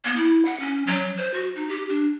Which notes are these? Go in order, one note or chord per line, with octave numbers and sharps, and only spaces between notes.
B3
E4
F#5
C#4
F#3
C5
F#4
D#4
G4
D4